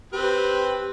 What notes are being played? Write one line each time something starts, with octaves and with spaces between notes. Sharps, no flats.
C4 G4 B4